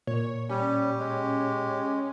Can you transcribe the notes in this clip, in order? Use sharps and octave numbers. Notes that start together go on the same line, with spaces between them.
A#2 C#5
G3 C#4 G4
G#3